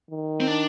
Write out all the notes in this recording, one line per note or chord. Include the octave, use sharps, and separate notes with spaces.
D#3
C4
D4